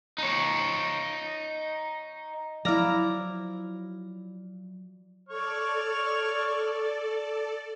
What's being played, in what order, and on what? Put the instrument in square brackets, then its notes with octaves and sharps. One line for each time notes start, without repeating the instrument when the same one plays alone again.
[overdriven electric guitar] D#4 C#5
[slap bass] F3 F#3 [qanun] E4 A#5 [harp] D5 F5 F6
[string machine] A4 D5 [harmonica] C#5 C#6 F6